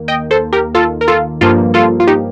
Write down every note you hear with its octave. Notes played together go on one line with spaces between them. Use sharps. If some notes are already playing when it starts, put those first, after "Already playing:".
Already playing: D#2 D#3 A#3
D#5 G5
A4 C5
G4 A#4
F4 A4
A#4
F4 A4
G2 F3 A#3 F4 A4
F4 A4
F4
D#4 G4